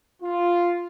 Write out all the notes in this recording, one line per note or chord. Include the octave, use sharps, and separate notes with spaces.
F4